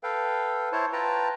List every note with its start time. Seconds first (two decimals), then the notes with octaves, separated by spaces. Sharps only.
0.03 A4 B4 F5 G5
0.72 E4 C5 C#5 A5
0.93 F4 B4 G5 A5 A#5